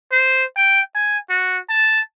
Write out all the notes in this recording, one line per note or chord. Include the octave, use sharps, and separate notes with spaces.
C5
G5
G#5
F#4
A5